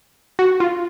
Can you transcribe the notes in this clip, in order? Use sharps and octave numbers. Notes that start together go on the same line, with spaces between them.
F#4
F4